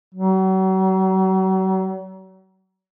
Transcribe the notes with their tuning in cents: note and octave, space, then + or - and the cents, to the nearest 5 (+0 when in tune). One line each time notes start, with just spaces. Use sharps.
F#3 +40